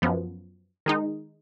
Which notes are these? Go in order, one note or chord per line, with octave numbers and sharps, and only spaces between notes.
F#2 F3 B3
D#3 G#3 D#4